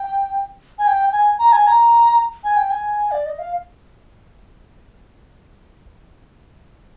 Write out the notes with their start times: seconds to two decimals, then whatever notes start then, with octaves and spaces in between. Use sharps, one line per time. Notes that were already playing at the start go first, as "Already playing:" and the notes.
Already playing: G5
0.79 G#5
0.87 G5
1.12 G#5
1.39 A#5
1.52 G#5
1.67 A#5
2.44 G#5
2.57 G5
2.71 G#5
3.11 D5
3.26 D#5
3.39 F5